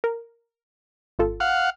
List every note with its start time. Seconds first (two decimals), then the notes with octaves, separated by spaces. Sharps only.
0.04 A#4
1.19 G#1 F4 A4
1.40 F5 F#5